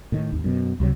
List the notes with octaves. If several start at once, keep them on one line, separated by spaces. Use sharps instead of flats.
A2 D#3
G#1 D#2
F#2 B2
C#2 C3 F#3